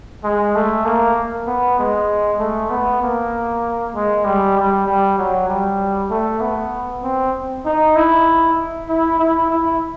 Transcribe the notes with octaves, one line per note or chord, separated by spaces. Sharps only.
G#3
A3
A#3
B3
G#3
A3
B3
A#3
G#3
G3
G3
G3
F#3
G3
A3
B3
C4
D#4
E4
E4
E4
E4